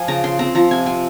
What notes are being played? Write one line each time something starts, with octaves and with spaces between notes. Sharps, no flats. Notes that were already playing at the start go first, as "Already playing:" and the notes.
Already playing: F3 G#5
C#3 A#5
C#4 C6
C4 A#5
F3 A#5
C3 G#5
C4 G#5